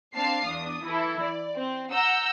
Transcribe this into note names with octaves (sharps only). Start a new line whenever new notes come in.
C4 D4 F5 A5 C7
E2 D4 D#6
E3 E4 A4
D5
C4
F#5 A#5 E6 G6